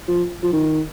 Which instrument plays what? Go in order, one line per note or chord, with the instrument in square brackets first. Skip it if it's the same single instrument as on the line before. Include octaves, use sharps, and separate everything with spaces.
[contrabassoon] F3
F3
D#3